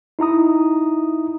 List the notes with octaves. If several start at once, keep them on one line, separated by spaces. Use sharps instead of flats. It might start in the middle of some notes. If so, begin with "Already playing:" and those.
D#4 E4 A#5 D#6